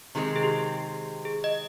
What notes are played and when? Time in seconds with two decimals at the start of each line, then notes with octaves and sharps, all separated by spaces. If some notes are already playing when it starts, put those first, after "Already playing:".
0.15 C3 D#3 G#3 C4
0.36 G#4
0.43 G4
1.25 G#4
1.44 D#5